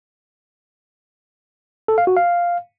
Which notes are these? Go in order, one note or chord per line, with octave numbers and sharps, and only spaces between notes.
A4
F5
F#4
F5